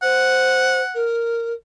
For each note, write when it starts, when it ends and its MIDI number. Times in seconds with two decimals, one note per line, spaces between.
0.03 0.82 72
0.03 1.03 78
0.95 1.53 70